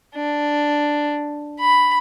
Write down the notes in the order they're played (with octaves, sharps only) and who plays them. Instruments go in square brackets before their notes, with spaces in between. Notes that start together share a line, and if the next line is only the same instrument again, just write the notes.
[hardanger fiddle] D4
B5